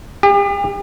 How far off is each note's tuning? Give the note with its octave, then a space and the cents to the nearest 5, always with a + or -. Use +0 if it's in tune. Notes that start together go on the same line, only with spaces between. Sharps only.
G4 +40